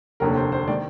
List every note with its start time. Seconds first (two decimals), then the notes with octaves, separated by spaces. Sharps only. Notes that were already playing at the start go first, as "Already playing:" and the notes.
0.20 F1 D#2 D3 A#4
0.36 C5
0.52 C5
0.68 D#3 D5